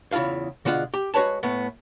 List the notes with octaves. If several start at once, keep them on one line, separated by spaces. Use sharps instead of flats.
E2 C#3 E4 F4 F5
B2 D3 G#3 F4 F#5
G4
G#3 F#4 B4 C#5 A5
A2 A3 B3